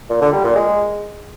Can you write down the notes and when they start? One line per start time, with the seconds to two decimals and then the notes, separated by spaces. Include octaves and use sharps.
0.10 A#2
0.22 D3
0.33 G3
0.44 A#2
0.56 G#3